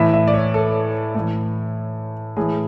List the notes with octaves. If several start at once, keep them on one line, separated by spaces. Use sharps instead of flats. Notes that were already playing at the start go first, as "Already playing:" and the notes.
Already playing: A2 E3 E5
E5
D5
C#5
A4
A2 E3
A2 E3 G#4